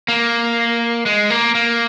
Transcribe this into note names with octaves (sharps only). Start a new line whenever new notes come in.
A#3
G#3
A#3
A#3